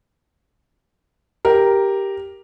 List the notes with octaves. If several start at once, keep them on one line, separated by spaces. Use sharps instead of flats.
G4 A#4